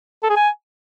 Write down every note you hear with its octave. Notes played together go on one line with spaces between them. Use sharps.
A4
G#4
G#5